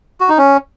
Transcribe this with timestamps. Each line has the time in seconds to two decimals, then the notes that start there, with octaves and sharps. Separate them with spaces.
0.20 F#4
0.29 D#4
0.38 C#4